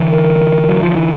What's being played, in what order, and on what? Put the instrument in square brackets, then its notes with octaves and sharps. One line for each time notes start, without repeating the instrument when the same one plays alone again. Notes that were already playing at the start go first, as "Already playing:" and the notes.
Already playing: [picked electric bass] D3 E3
[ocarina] A#4
[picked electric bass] F#3
F3
E3